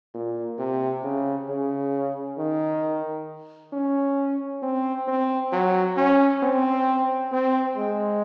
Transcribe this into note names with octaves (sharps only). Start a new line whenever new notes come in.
A#2
C3
C#3
C#3
D#3
C#4
C4
C4
F#3
C#4
C4
C4
G#3